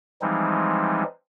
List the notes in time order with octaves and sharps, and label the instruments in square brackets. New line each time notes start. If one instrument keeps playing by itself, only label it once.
[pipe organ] E3 F3 G3 G#3 C4 D#4